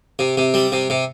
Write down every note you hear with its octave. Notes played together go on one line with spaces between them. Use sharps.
C3
C3
G3
C3
C3